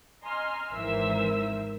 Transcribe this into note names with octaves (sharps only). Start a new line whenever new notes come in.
D#5 G#5 A#5 C6 F6
G#1 E3 A#4 C5 E5 E6